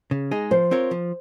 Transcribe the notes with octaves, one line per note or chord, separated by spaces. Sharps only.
C#3
G#3 D#4 G#4
F3 C5
C4 F4 A#4 C#5
F3